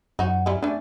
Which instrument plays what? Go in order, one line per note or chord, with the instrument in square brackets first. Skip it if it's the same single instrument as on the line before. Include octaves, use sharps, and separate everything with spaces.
[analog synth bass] F#2 [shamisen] D#4 F#4
[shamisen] G3 C#4 E4
[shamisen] A3 C#4 [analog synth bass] D4